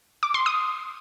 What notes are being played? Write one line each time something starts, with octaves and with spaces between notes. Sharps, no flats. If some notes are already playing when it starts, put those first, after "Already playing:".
D6
C6
D#6